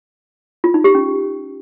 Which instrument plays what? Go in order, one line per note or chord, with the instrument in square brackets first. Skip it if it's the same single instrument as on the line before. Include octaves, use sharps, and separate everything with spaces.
[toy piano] F4
D#4
G4
C#4